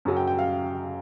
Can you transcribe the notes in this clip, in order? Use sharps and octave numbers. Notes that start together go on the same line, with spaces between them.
F#2 C#3 F#3
G5
G5
F5